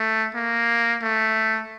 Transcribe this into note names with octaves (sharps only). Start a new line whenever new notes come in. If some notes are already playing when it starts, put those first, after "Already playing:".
Already playing: A3
A#3
A3